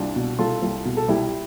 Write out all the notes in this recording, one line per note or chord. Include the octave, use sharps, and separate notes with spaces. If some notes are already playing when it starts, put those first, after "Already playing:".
Already playing: C2 D4 F4
B2
C2 F4 A4
C2
B2
A4
C2 E4 G4